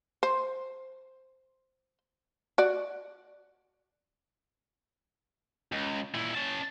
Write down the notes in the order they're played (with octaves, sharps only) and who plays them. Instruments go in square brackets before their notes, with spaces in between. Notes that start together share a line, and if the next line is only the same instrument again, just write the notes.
[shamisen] C5
F#4 D5
[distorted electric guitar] C#2
A#2 E4
C#4 A5